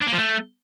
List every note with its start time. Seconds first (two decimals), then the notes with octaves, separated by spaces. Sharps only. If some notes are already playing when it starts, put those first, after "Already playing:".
0.01 D4
0.07 A#3
0.12 F3
0.18 A3